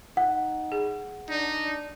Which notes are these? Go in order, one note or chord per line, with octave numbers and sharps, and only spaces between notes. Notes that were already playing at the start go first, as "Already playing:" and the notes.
D#4 F#5
G#4
D4 D#4